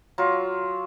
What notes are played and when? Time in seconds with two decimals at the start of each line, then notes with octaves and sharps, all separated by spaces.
0.18 F#3 F4